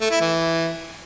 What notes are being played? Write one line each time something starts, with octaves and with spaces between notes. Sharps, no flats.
A3
E4
E3